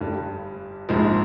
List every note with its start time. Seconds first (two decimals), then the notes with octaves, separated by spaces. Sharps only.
0.01 G1 G2 G3
0.89 A#1 G#2 F3 G#3